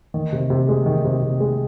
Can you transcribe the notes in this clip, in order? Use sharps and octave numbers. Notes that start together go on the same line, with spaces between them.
D#3
C3
C3
G#3
D#3
C3
C3
G#3